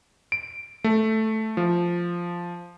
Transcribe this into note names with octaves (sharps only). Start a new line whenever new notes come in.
D7
A3
F3